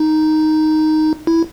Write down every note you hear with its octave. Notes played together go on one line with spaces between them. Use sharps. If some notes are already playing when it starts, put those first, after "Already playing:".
Already playing: D#4
E4